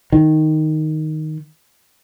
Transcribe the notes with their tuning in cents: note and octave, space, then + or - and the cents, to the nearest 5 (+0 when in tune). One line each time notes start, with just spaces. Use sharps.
D#3 +0